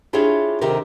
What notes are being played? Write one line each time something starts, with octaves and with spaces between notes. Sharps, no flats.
D4 E4 F4 G4 G#4 C#5
D2 C3 D#3 G4 A#4